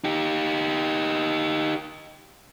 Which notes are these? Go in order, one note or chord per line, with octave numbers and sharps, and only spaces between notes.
D#4 G4